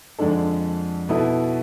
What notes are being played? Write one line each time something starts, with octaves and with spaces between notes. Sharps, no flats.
F2 D3 G#3 D4 A4
B2 B3 E4 A4